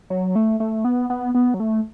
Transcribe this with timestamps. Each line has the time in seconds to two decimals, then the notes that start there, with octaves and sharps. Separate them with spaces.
0.10 F#3
0.36 A3
0.60 A3
0.85 B3
1.10 B3
1.35 B3
1.54 F#3
1.60 A3